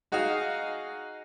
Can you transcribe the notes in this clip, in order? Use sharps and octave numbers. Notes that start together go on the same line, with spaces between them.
D#4 F#4 G#4 D#5 F5